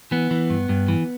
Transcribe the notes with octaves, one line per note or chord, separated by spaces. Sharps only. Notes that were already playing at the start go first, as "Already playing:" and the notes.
E3 B3
E3
G2
G2
E3